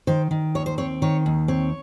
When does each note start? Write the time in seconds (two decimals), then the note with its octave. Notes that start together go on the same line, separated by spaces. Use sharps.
0.07 D#3 C5
0.31 D#3
0.55 D#2 C#5
0.66 C5
0.78 C4 C#5
1.02 D#3 C#5
1.26 D#2
1.48 C4 C#5